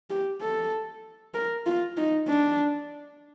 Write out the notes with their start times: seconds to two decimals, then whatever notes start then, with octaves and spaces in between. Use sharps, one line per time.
0.10 G4
0.41 A4
1.34 A#4
1.66 F4
1.97 D#4
2.28 D4